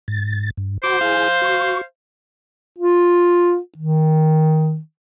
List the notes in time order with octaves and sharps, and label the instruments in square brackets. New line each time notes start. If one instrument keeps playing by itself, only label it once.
[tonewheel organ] G#2 A6
G2
[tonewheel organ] F#4 F#5 B5 [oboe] C5 [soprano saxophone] D6
[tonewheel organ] E4 G#4 G#5 [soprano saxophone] F5
[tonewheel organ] F#4 C#6
[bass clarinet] F4
D#3